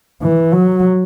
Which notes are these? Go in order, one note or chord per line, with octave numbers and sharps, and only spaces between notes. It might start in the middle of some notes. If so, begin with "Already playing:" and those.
E3
F#3